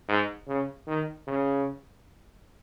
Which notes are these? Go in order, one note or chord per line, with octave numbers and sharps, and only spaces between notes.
G#2
C#3
D#3
C#3